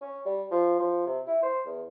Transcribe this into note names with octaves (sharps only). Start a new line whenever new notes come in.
C#4
G3
F3
F3
C3
E4
C5
E2